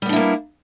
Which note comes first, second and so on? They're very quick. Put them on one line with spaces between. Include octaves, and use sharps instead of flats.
G3 B3 D4 E4 A#3